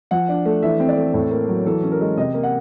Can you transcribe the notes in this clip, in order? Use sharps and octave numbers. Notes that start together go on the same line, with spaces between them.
F3 F#5
D4
A3
E3 E5
C4
D5
A3
A2
A#3
F#3
E3 A4
C#4
A#4
G#3
C3 D#5
A#3
F#5